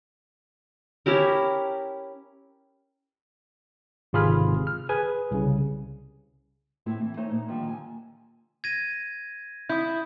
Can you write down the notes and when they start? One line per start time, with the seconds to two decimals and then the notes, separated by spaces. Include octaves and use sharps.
1.06 C#4 E4 G4 A#4
4.13 G#1 C3 F4 G#4 B5 F6
4.67 F6
4.89 G#4 B4 G#5
5.31 C2 C#3
6.86 A2 A3 C4 E4 A4
7.01 E3
7.17 A3 D#4 A4 C5 C#5
7.31 A#2 D#4
7.48 D3 D#3 F3 G3 A#3
7.66 A4 G#5
8.64 G#6 A#6 D#7
9.69 E4 D#6 G6